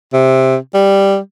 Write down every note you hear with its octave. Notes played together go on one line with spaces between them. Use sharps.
C3
G3